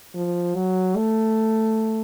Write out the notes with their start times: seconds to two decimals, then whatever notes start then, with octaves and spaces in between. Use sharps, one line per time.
0.15 F3
0.55 F#3
0.96 A3